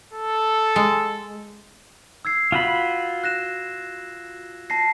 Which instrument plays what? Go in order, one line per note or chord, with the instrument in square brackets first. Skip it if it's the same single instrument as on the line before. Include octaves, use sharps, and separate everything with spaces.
[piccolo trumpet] A4
[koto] G#3
[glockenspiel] E6 G#6 C7
[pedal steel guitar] F4 F#4 B5
[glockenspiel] F#6 A#6 E7
A5 A#6 C7